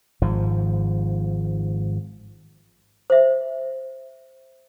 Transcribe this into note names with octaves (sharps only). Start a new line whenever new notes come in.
G#1 G#2 F3
C5 E5